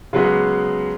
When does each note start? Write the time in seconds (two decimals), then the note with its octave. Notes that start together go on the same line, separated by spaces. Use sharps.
0.13 C#3 F#3 G#3 B3